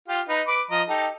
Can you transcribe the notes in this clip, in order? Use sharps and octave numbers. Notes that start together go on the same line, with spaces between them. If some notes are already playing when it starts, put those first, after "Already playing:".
F4 G4
D#4 B4
B4 D6
F3 D#5 A#5
D#4 G4 A4